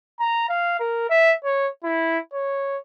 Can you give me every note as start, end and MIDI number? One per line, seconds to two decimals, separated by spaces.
0.20 0.49 82
0.49 0.80 77
0.80 1.06 70
1.10 1.34 76
1.44 1.69 73
1.84 2.19 64
2.33 2.77 73